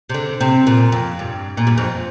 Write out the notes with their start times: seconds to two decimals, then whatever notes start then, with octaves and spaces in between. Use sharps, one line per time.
0.09 C3
0.14 D3
0.40 C3
0.67 A#2
0.92 F2
1.19 G2
1.57 A#2
1.67 G2
1.78 F2